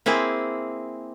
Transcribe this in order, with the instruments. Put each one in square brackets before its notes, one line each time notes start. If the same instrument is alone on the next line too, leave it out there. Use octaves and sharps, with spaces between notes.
[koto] A#3 C4 E4 G#4